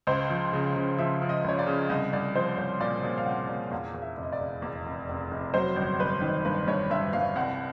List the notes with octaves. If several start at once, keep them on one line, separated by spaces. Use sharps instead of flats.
C#2 C5
F3
C#3
C#3
F3 E5
F3
D#5
C#2 C#5
D5
C#3
C2 D#5
C2 D5
F3 C5
C2 C#5
A#2 D5
A#2
F5
C2 F#5
A#2
E2 F5
E2
E5
F1
D#5
D5
F1
E2
F1
F1
F1
F#3 C5
G1
G1 B4
D#3
G2 B4
G2 C#5
G2 E5
G2 F5
C2 F#5